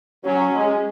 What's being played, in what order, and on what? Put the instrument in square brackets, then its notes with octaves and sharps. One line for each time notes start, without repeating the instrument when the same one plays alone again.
[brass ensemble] F#3 [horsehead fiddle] C#4
[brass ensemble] G#3